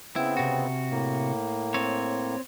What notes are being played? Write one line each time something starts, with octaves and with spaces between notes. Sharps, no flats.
C#3 B3 C4 E4
C3 F#4
A2 A#3
C4 C#5